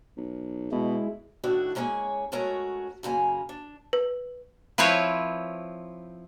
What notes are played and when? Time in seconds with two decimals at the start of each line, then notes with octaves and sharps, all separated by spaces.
0.17 B1
0.72 B2 G#3 E4
1.44 A2 D#3 D4 E4 F#4
1.75 G#3 A#3 C#4 G#4 C#5
2.32 G#3 A3 C#4 F#4 A#4 C#5
3.03 F#2 C#3 A#3 G#5
3.49 D4
3.93 B4
4.78 F3 C4 E4 B4 C#5 F5